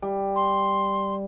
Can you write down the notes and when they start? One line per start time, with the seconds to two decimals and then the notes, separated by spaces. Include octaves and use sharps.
0.02 G3
0.36 C6